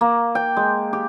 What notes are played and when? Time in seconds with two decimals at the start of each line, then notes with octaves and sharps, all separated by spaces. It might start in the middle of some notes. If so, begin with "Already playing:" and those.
0.01 A#3
0.35 G5
0.57 G#3
0.93 G4